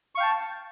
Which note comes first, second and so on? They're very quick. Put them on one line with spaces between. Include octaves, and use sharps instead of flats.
C#6 F5 G5 A5